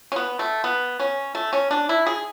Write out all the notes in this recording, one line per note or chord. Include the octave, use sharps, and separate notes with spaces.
C#4
B3
A3
B3
C#4
A3
C#4
D4
E4
G#4